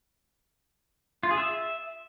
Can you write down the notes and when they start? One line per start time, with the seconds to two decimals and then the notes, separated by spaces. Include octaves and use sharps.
1.23 F4
1.30 G#4
1.38 E5